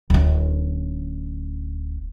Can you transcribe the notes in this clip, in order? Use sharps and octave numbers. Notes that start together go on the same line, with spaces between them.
D1 C#4